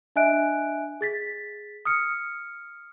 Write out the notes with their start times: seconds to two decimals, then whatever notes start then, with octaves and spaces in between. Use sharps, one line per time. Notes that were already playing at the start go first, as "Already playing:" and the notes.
0.16 D4 D#5 E5 G#5 F#6 D7
1.01 G#4 A6 B6
1.85 D#6 F6 C#7